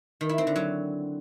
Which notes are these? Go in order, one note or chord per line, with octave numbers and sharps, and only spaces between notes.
D#3
E4
C4
D3
F#3